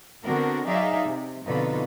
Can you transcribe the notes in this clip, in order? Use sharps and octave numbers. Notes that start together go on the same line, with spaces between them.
D3 B3 C4 D4 F#4 A#4
F#3 D#4 G#4 D5 E5 F5
C3
F2 B2 D3 D#4 F4 B4